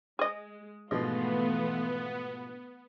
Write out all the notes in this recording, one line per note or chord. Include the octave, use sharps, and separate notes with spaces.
G#3 G#4 D#5
G#2 B2 E3 F3 A3 B3 F4